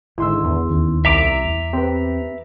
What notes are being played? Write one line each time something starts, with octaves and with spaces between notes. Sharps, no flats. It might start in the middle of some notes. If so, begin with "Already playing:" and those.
G#1 G#2 D3 E4 C6 E6
E2
D#2 D#3 C#4
C2 E5 A#5 D6
E2
C4 G4 B4